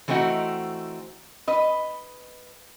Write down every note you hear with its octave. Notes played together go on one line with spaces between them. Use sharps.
E3 A3 C4 D#4 F#4
B4 D#5